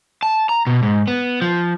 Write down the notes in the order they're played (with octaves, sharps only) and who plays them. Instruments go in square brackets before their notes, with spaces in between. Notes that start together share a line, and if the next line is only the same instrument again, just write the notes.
[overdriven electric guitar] A5
A#5
B2
G#2
B3
F3